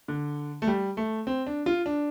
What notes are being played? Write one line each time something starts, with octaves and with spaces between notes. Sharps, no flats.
D3
A3
G3
A3
C4
D4
F4
D4